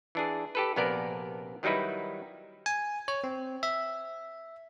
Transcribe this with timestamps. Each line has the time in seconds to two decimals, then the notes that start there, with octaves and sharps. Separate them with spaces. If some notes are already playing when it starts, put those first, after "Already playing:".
0.15 E3 D4 G#4
0.55 G4 A4 B4
0.76 A#1 C3 A#3 B3 A#4 D5
1.63 D#3 F#3 G3 D#4 E4 B4
2.66 G#5
3.08 C#5
3.24 C4
3.63 E5